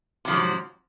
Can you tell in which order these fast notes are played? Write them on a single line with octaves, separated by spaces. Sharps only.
C3 F3 G#2 F#3